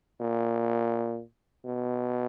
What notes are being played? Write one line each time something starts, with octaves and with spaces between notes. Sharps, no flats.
A#2
B2